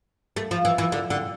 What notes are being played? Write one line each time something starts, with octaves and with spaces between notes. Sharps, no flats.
A3
F3
E3
E3
D3
D3